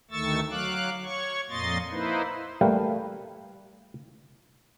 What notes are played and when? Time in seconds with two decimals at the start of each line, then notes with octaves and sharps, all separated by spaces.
0.11 D2 D#3 A3 C#6 E6 A6
0.51 F#3 F5 D6 F#6
1.04 C#5 C#6
1.50 F2 A#2 A#3 D#5 C6 A6
1.91 A#3 D#4 E4 B4 C5
2.61 G3 A3 A#3 B4 F5 G5